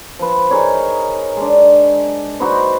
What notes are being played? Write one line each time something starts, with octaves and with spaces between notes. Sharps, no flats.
F3 B4
D#4 G#4 A#4 C#5
G#3 D4
D#4 F#4 B4 C5